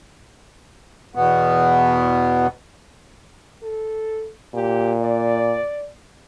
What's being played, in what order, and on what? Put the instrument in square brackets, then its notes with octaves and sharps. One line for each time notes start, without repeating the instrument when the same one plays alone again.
[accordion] E2 B2 B3
[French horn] A4
[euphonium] A#2 [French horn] G4
[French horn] D5